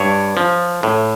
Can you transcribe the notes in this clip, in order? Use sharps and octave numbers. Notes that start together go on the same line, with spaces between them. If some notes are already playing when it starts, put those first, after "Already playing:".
Already playing: G2 C#5
F3
A2